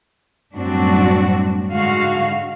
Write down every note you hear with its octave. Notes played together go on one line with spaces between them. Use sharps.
F#2 A2 G3 C4 D4 F#4
G#2 D3 G#3 F#4 F5